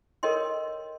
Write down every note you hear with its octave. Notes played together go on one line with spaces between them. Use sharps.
A4 A#4 C#5 D#5 G5 C6